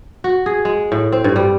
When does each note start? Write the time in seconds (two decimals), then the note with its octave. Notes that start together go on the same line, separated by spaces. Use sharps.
0.24 F#4
0.46 G#4
0.65 G#3
0.92 A2
1.12 C4
1.24 G2
1.36 G3